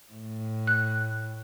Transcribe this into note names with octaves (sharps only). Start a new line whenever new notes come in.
A2
F#6